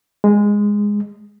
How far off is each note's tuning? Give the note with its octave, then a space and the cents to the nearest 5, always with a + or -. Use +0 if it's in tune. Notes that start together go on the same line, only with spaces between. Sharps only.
G#3 -10